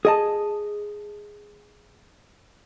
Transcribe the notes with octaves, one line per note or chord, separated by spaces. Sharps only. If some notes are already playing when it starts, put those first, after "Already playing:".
G#4 D#5 A5